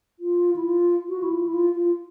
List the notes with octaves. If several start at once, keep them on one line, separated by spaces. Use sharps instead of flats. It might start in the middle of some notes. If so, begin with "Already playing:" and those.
F4
E4
F4
F#4
E4
F4
E4
F4
F4